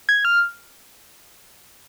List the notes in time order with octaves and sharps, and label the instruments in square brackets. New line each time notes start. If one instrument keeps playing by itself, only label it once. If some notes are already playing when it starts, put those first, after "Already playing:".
[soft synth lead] G#6
F6